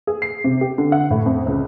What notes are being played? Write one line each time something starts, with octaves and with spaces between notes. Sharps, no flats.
G#4
C7
C3
G4
D3
F#5
A2
F2
C#2